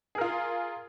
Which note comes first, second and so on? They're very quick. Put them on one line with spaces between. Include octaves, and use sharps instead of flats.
G#4 A#4 F4